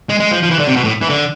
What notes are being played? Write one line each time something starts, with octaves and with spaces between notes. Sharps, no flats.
G#3
G#3
F3
F3
E3
D3
C3
B2
A2
E3
D3